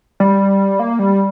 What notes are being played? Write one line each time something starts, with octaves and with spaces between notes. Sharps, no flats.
G3
A#3
G3